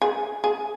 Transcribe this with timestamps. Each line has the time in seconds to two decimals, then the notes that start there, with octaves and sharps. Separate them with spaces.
0.02 G#4
0.44 G#4